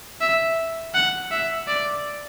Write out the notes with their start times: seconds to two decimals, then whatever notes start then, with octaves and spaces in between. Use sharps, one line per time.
0.21 E5
0.94 F#5
1.31 E5
1.68 D5